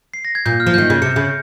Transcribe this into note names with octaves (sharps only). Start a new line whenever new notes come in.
C7
A#6
G#6
A#2 G6
F6
F3
G6
D#3
C#3
C3 C#7
C#3